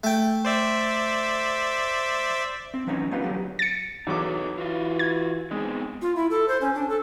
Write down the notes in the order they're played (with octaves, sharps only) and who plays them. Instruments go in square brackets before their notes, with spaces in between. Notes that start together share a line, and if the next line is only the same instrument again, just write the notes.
[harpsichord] A3 G5
[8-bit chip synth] C5 D5 E5
[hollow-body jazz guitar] C4
E3 F#3 B3 C#4 D#4 C#5
A#3 B3 D#4 F4 G4 B4
D3 F#3 B3 G4
[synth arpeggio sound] A6 C#7
[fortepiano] E2 F#3 D6 [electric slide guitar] D#4 A4 B4
[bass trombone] E3 [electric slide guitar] F4 F#4 F5
[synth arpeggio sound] G#6
[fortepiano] G#3 [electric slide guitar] B3 C4 D#4
[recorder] F4
E4
A4
C5
C#4
D4
A4